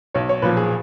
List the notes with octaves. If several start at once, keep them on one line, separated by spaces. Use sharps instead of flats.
B1 C#5
C#5
A#2 F3 B4
G#4